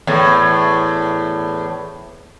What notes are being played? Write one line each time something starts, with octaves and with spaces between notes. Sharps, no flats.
E2 A2